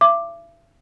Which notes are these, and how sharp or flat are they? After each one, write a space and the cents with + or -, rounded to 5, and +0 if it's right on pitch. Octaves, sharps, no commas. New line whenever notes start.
E5 +40 D6 +5